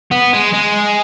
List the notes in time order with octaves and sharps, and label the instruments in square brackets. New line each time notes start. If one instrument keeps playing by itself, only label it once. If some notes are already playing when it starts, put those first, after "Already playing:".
[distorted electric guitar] B3
G#3
G#3